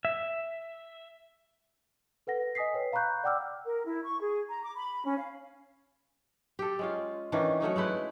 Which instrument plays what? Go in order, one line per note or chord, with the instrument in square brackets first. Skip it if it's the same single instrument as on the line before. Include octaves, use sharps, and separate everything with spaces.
[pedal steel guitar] E5
[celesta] A4 B4 F#5 A#6
D#5 G#5 D#6 B6 C7
B4 C#5 G5
F5 A#5 B5 C#6 F#6 G6
D5 F#5 G5 D6 E6 F6
[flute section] A#4
E4
C#6
G#4
A#5
D6
B5
C#4
F5
[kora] G4 A4
G#3 C#4 F4
D#3 E3 C#4 D4
F#3 A3 C#4 D#4
G#3 A3 E4 B4